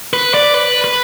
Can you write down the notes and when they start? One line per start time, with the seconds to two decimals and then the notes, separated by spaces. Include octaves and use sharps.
0.13 B4
0.34 D5
0.54 B4
0.84 B4